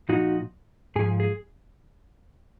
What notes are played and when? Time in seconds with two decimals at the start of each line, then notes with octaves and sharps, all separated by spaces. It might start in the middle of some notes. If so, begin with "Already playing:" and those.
0.09 A#2 F3 D#4 F#4
0.96 G#2 F3 G#4
1.20 G#4